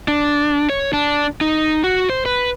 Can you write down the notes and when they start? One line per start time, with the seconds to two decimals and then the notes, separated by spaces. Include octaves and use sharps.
0.08 D4
0.69 C#5
0.93 D4
1.41 D#4
1.84 F#4
2.10 C5
2.26 B4